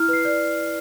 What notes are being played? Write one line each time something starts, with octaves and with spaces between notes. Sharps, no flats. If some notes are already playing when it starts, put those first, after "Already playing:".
Already playing: E4 F6
B4 C7
D5